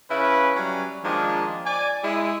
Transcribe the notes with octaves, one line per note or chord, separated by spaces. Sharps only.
C#3 C#4 E4 B4
F#3 G3 C#4
D#3 F3 G#3 A#3 D4
D5 G#5
G#3 E4